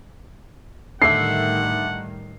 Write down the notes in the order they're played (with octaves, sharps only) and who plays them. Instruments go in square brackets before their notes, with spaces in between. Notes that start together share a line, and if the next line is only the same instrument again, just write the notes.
[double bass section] A2 D#3 G3 [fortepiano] D3 A3 E5 [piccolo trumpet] F#5 [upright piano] C7